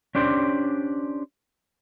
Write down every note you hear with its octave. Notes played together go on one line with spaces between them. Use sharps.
C#4 D4 G4 C5 D5